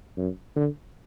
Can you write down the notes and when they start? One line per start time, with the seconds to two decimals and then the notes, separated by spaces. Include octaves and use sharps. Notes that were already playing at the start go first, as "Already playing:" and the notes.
0.17 F#2
0.56 D3